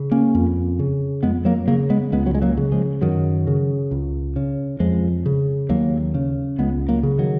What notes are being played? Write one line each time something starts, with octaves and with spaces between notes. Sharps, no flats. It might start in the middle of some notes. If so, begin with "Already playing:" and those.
Already playing: C#3
A#3 C#4
F2
C#3
F2 G#3 B3
F#3 A#3
C#3 F#3 A#3
G#3 B3
C#2 G#3 B3
F#3
G#3
F#3 A#3
C#3
F3 G#3
F#2 D#3 F#3
C#3
C#2
C#3
F2 F3 G#3
C#3
D#2 F#3 A#3
C#3
C#2 G#3 B3
F#3 A#3
C#3
D#3 F#3